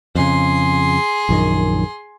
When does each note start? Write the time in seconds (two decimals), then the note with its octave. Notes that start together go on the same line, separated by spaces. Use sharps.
0.15 F2 C#3 G#4 C6
1.29 A#1 F#2 D#3